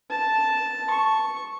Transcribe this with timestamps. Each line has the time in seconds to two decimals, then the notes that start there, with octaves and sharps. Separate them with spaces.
0.10 A5
0.90 C#6